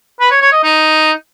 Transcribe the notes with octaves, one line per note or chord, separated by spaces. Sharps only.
B4
C#5
C#5
D#5
D#4